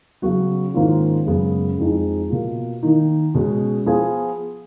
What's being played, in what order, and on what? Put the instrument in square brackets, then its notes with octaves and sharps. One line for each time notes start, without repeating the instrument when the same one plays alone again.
[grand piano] C#3 F#3 B3 F#4
G#2 D#3 A#3 C#4 F4
F#2 C#3 G#3 B3
F2 F3 G#3 D#4 G#4
B2 A#3 F4
D#3 A#3 D#4
B2 G#3 C#4
F3 B3 F4 G#4